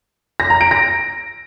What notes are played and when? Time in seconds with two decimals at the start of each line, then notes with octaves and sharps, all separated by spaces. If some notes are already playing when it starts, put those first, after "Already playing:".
0.40 A#6
0.50 A#5
0.61 D7
0.71 A#6